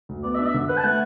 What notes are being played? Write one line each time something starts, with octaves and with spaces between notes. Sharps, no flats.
D2
B3 D5
E5
D4 D5
E5
D3
B4 F#5
A5
A3 F#5